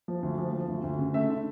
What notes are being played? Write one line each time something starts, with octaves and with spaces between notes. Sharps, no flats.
F3
D2
F3
F3
D2
D2
C#3
A3 E5
D3